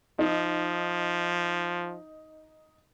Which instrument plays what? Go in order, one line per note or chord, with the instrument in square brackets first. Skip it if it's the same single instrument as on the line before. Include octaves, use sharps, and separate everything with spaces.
[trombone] F3 [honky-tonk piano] D#4